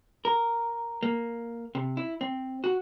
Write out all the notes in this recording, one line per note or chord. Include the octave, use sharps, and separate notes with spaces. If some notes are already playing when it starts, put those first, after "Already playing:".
A#4
A#3
C3
E4
C4
F#4